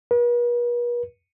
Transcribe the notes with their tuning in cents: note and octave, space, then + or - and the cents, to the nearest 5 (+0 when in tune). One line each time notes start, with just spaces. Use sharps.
B4 -45